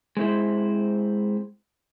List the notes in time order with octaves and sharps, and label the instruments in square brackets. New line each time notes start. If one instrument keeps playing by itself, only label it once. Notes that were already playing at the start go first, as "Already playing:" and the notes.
[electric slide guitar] G#3 C4 E4 C5